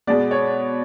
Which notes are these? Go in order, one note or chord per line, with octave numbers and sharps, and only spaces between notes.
B2 G#3 B3 D5
C#5